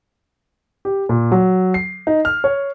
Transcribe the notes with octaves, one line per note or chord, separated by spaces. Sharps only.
G4
A#2
F#3
C7
D#4
F6
C#5